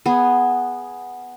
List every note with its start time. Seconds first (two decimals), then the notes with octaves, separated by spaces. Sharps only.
0.06 B3 G#4